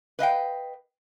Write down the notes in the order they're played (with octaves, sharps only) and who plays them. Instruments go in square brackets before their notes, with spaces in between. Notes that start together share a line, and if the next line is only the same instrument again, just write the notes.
[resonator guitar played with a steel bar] B4 D#5 F5 G5